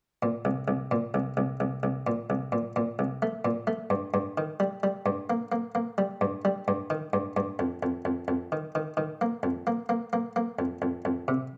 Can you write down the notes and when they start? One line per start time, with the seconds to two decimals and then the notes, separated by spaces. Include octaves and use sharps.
0.23 A#2
0.45 C2
0.68 C2
0.91 A#2
1.14 C2
1.37 C2
1.60 C2
1.83 C2
2.07 A#2
2.30 C2
2.52 A#2
2.76 A#2
2.99 C2
3.22 A3
3.45 A#2
3.67 A3
3.90 G2
4.14 G2
4.38 D#3
4.60 G3
4.83 G3
5.06 G2
5.30 A#3
5.52 A#3
5.75 A#3
5.98 G3
6.21 G2
6.45 G3
6.68 G2
6.90 D#3
7.13 G2
7.37 G2
7.59 F2
7.83 F2
8.05 F2
8.28 F2
8.52 D#3
8.75 D#3
8.97 D#3
9.21 A#3
9.43 F2
9.67 A#3
9.89 A#3
10.13 A#3
10.36 A#3
10.59 F2
10.82 F2
11.05 F2
11.28 C3